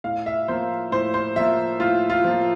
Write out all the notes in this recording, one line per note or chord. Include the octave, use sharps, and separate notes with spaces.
A2 F5
E5
F3 A#3 C5
A2 C5
C5
F3 A#3 E5
A2 F4
F4
F3 A#3